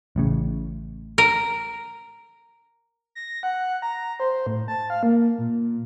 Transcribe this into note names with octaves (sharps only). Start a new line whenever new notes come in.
A1 A2 C#3
A#4
A#6
F#5
A#5
C5
A2
A5
F5
A#3
A#2